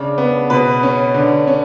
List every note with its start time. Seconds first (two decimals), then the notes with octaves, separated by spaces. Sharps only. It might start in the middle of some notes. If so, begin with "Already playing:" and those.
Already playing: C#3 D4
0.18 B3
0.50 B2 B4
0.83 C#4
1.14 D3
1.47 C#4